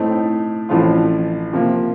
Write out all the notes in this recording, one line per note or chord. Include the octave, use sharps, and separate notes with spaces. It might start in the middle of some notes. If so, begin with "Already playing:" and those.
Already playing: A2 A3 C4 D#4
A1 A2 F3 C4 F4
C3 F3 A#3